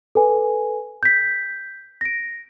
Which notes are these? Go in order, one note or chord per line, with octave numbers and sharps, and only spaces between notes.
A4 B4 G#5
G6 B6
A#6 D7